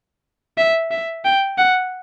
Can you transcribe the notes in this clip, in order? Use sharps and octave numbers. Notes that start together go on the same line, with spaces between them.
E5
E5
G5
F#5